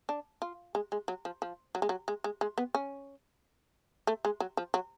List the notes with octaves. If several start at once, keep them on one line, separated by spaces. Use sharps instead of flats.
D4
F4
G#3
G#3
F#3
F3
F3
F#3
G#3
F#3
G#3
G#3
G#3
B3
C#4
A3
G#3
F#3
F3
F#3